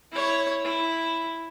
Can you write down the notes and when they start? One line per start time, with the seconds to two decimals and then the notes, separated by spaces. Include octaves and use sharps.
0.12 E4 C#5
0.65 E4